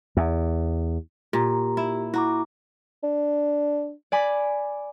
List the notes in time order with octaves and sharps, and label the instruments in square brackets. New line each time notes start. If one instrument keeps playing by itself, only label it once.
[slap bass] E2
[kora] A#2 [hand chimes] G4 A#5
[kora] E4
[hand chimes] E4 A#5 D6 [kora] F#4
[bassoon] D4
[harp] D5 G#5 B5 D6